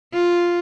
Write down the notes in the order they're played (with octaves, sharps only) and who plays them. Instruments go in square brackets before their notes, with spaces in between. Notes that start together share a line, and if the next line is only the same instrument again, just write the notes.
[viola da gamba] F4